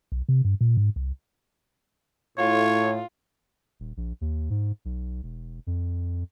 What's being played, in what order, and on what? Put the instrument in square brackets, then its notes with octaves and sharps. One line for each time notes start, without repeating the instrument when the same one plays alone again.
[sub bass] B1
C3
G2
A#2
G#2
C2
[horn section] A2 [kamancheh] F4 [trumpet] C#5
[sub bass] D#1
A#1
D#2
G#2
B1
E1
F2